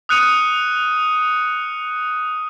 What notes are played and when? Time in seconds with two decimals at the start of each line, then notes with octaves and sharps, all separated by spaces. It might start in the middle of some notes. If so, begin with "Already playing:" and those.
0.09 D#6 F6 F#6 C#7 D#7 F7